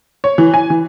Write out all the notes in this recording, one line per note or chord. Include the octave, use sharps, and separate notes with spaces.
C#5
E3
G#5
E3